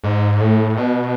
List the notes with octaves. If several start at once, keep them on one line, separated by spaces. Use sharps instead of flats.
G#2
A2
B2